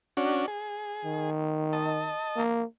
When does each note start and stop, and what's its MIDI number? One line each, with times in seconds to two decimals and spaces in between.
0.17 0.46 61
0.17 0.46 62
0.17 0.46 66
0.48 1.30 68
1.05 2.12 51
1.73 2.43 75
1.73 2.43 81
2.36 2.64 58